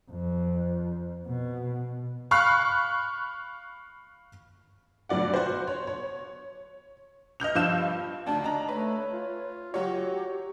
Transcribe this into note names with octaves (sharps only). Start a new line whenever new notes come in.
F2
B2
F5 B5 C#6 F6 F#6
D2 G2 F#3 D5 F#5
F#4 C5
C#5
C#5
D#5 F6 G6 F7
G2 F3 F5 E6 G6 E7
D2 D4 D#4 A5
D4 D#5 A#5
A3 B4 C#5
F4
F#3 F#4 G4 C#5